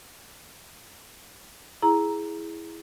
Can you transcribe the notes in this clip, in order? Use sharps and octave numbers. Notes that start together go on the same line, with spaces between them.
E4 G#4 A#5